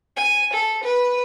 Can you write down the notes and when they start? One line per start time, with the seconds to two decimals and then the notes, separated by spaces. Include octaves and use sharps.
0.16 G#5
0.53 A4
0.83 B4